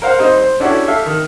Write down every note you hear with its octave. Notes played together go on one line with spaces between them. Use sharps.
A#4 C5 F5 F#5
G3 C4 D#4 C5
C5
C#4 D4 E4 F#4 G4 A4
G4 A4 E5 F5
D#3